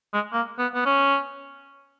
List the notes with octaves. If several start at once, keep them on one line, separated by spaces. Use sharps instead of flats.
G#3
A#3
B3
B3
C#4